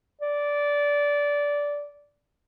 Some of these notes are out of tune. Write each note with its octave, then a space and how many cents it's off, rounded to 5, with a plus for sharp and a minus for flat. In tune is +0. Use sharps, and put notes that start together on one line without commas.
D5 -15